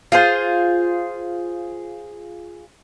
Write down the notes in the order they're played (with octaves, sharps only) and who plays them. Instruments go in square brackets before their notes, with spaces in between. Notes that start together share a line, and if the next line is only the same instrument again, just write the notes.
[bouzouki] F4 G#4 C5